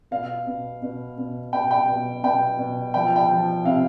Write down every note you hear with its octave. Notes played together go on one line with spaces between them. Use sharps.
B2 F5
B2
B2
B2
B2 G5
G5
B2
B2 G5
B2
F3 G5
G5
F3
C3 F5